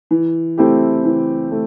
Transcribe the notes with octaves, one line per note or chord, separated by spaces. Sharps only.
E3
A3 C4 E4 G4
E3
A3